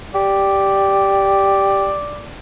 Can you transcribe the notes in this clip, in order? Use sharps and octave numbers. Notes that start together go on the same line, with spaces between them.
G4 D5